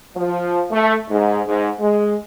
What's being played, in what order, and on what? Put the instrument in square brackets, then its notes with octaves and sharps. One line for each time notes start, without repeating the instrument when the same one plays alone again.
[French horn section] F3
A3
G#2
G#2
G#3